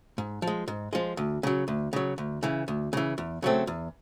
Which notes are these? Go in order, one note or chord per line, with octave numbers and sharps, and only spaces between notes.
G#2
F3
G#3
G#2
F3 G#3
D2
C#3 F#3
D2
C#3 F#3
D2
C#3 E3
D2
C#3 E3
E2
C#3 F#3 A3 C4
E2